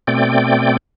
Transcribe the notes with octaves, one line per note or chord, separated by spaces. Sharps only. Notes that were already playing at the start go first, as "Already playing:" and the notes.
B2 A3 C4 D5 G5